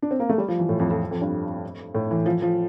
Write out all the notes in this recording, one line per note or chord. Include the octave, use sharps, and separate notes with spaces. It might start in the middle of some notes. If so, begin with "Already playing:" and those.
D4
C4
A#3
A3
G3
F3
E3
A2
F2
F2
F2
G2
A2
E3
F3
F3